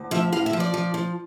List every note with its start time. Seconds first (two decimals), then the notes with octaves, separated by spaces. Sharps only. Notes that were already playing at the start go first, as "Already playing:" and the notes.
Already playing: D2
0.11 F3 E5
0.32 A2 F5
0.46 E5
0.53 F3
0.60 D5
0.74 F3
0.94 F3